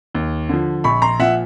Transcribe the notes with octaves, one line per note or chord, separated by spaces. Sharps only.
D#2
D3 F3
A#1 B5 C#6
A#5 C6
A#2 F3 E5 F#5